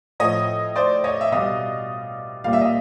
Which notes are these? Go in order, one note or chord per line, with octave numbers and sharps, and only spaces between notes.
A2 F3 C#5 D#5
C5 D5
C#5 D#5
E5
B2 G3 D#5 F5
A#2 G3 F5
E5
D#5